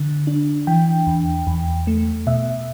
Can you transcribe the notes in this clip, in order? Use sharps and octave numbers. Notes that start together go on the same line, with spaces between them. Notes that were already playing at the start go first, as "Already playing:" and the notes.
Already playing: D3
D4
E3 G5
E2
E2
A3
B2 E5